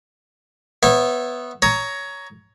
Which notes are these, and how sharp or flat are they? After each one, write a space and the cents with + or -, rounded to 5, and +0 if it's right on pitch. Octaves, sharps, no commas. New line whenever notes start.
B3 +0 C#5 -30 E5 +0
C#5 +15 A#5 +0 D#6 +40